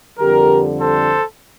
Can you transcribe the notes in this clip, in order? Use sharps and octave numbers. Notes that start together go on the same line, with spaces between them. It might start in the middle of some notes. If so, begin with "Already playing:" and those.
F2 D3 G3 G4 A#4
A4 C5